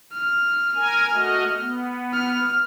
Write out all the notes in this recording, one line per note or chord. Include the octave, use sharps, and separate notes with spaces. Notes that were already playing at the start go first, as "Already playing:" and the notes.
F6
A#4 G#5
A3 F#4 D#5
B3
F6